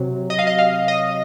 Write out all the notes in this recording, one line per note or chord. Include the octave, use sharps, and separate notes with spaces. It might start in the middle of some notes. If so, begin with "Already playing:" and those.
Already playing: C3 F#3
D#5
F5
D#5
F5
D#5